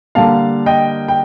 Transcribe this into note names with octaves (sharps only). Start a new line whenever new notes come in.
D3 G3 A#3 F5 A5
D#5 G5
G5